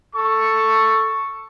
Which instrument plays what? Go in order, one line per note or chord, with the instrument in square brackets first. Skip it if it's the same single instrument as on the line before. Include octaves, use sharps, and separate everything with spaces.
[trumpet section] A4 C#6